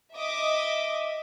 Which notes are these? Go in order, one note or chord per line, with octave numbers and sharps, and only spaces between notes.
D#5 E5 D6